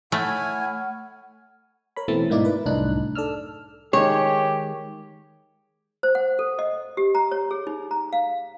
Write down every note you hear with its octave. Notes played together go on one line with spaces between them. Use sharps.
A3 E4 C#5 F#5 G#5 F6
A#4 C#5 B5
B2 E3 A3 C4 E5 A6
G#2 B2 A#3 D#4 E4 D5
B4
C2 F#2 A2 D4 D#4 F#6
A4 D5 E6 F6
D#3 G#3 G4 C#5
C5
F#5
A4
D#5
G4
A#5
C#5
G#4
D#4
A#5
F5